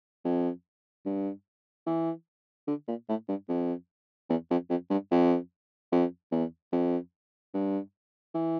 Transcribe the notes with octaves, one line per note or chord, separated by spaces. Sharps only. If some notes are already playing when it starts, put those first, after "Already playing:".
F2
G2
E3
D3
A#2
A2
G2
F2
E2
F2
F2
G2
F2
F2
E2
F2
G2
E3